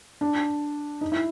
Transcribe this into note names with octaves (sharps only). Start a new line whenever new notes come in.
D4
D#4
E4